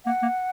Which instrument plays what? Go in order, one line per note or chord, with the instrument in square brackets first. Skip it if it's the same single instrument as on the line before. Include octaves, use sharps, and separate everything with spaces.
[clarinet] A#3 [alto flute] F#5
[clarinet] A#3